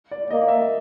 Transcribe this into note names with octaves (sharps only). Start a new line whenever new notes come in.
D5
A#3 D#5
E5